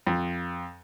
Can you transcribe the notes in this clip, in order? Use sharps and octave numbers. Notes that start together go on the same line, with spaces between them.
F2